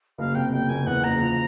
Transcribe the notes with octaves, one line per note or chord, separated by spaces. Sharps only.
F#1 F5
C3 G5
F#1 G5
F#1 G#5
E2 F#5
F#1 A#5
F3